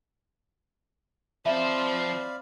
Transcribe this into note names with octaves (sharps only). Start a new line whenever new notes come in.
F3 C4 C5 D5 E5 F5 B5